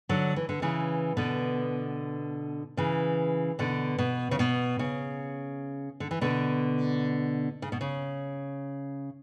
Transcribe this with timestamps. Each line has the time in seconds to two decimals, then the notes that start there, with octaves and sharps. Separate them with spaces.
0.09 D3 F#3
0.36 E3
0.49 D3
0.62 C#3 E3
1.17 B2 D3
2.77 C#3 E3
3.59 B2 D3
3.98 B2
4.31 C#3
4.39 B2
4.79 C#3
6.00 D3
6.11 E3
6.21 B2 D3
7.62 C#3
7.72 B2
7.81 C#3